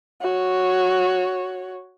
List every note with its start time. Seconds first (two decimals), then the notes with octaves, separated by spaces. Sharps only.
0.22 F#4 C#5